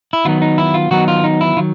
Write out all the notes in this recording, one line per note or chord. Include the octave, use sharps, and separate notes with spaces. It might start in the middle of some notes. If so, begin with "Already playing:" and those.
E4
D#3 F#3 B3 D#4 F4
D#4
E4
F4
D#3 F#3 B3 D#4 F#4
F4
D#4
E4
D#3 F#3 F4